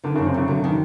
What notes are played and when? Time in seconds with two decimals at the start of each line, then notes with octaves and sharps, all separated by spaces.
0.04 D3 D#3
0.15 F#2 C#3
0.26 C3
0.34 C#3 A3
0.48 D3 F#3
0.64 D#3